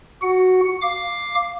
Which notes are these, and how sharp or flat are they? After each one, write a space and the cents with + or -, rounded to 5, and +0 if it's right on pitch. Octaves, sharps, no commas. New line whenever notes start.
F#4 +0 F#5 +0
F5 +0 D6 +0